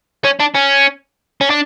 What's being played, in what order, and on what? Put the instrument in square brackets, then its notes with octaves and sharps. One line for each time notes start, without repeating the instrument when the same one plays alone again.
[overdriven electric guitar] C#4
D4
C#4
C#4
D4